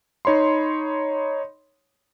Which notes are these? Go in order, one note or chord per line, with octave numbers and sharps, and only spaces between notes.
D#4 C#5 B5 C6